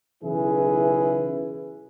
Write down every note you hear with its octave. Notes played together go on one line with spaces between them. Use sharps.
B1 C#3 E3 E4 G#4 B4